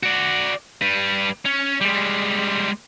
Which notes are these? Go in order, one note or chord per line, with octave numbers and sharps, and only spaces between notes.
F#4 D5
G3 B4
C#4
G3 G#3